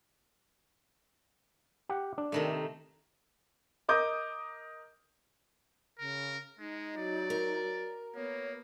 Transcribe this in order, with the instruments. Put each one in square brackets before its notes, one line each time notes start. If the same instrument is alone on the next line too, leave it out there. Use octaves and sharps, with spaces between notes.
[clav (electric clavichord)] G4 F#5
D4
[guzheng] C3 D#3 A3
[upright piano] A#4 D#5 D6 D#6 G6
[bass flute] C#3 [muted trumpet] A#4
[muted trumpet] G#3 [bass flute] D#4
[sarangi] F#3 [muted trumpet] D5
[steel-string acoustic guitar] A#4
[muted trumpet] A#3 [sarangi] B3 [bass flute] C#5